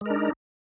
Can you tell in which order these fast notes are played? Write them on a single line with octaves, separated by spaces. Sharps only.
G#3 A#4 D4 D#4